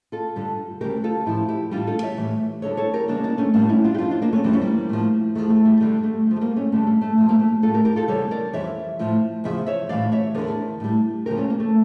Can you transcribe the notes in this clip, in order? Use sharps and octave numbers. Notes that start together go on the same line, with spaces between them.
F4 A4
G2 D3 G3
D2 C#3 G3 G4 A#4
F4 A4
A2 F3 E4 G4
E4 G4
A2 E3 G3 D4 F4
F4 A4
C#5 E5
A2 E3 G3
E2 D3 G3 A4 C#5
A4 C#5
G4 A#4
E2 C#3 G3 A#3 D4
A#3 D4
A3 C#4
A2 G3 A#3 D4
C#4 E4
D4 F4
G4
G2 F3 D4 F4
D4 F4
A#3 D4
A3 C#4
F2 E3 G3 A#3
C#4
G3 A#3
A2 F3
E2 D3 F3 A3
A3
G3
G2 D3 G3 A3
A3
G2 F3
A3
G3 A#3
A3 C#4
G2 D3 G3 A3
G3
A3
G2 F3 A3
G3 A#3
A3
A2 G3 F4 A4
G4 A#4
G4 A#4
F4 A4
E2 C#3 G3 A4 C#5
A#4 D5
F2 E3 G3 C#5 E5
A2 F3
E2 C#3 F3 E5
C#5 E5
A2 E3 G3 D5 F5
C#5 E5
E2 D3 F3 A#4 D5
A2 G3
D2 C#3 F3 G4 A#4
A3 C#4
A#3
A3